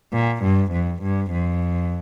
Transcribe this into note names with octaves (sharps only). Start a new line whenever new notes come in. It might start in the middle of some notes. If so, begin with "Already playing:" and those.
A#2
G2
F2
G2
F2